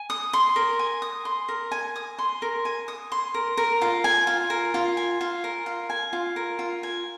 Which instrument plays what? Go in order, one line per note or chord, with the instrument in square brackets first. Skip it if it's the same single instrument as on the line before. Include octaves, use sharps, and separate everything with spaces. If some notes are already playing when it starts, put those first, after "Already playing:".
Already playing: [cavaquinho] G#5
D#6
C6
A#4
G#5
D#6
C6
A#4
G#5
D#6
C6
A#4
G#5
D#6
C6
A#4
A#4
F4
G#5
F4
A#4
F4
G#5
F4
A#4
F4
G#5
F4
A#4
F4
G#5